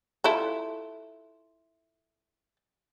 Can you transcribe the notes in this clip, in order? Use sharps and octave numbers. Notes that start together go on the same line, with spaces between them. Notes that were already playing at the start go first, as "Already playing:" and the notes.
E4 F4 A4